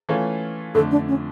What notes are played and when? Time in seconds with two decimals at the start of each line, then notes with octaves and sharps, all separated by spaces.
0.09 E3 A3 C#4 F4
0.74 F2 D3 A3 A4
0.91 D4
1.08 C#4